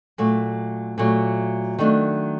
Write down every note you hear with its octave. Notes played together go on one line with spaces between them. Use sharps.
A#2 F#3 A3
A#2 F#3 A3
D#3 F#3 A3 D4